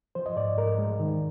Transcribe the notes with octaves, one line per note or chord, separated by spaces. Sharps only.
F3 C5
D#5
G#2 D5
G#2 A#4
G#3
D#3